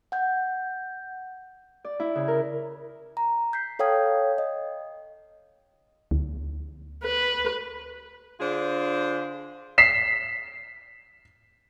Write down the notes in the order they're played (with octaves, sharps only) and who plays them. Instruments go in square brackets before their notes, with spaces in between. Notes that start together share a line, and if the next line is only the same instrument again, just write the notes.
[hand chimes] F#5 G6
[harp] D5
E4
C#3
A#4
[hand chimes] A#5
G6 B6 C7
A4 C#5 F5 G5 D#6 G#6
D#5
[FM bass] D2
[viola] B4
[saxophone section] D3 D4 F4 G#4 C5
[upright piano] B6 C7 E7